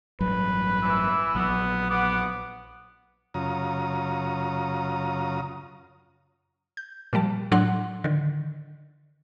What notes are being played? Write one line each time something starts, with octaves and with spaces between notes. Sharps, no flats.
A1 G2 F#3 B4
E3 E6
A#1 F#3 B3
B3 F#5 D6
F#2 C#3 F4 A#5 D#6
G6
A#2 F3 G3 A5
A2 F#3 D4 F#5 C6 F#6
D3 D#3